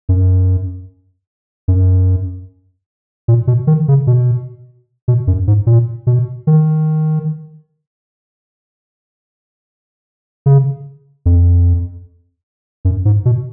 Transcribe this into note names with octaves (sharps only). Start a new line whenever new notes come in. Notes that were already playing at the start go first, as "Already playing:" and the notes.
F#2
F#2
A#2
B2
D#3
C#3
B2
B2
F#2
G#2
A#2
B2
D#3
C#3
F2
F#2
G#2
B2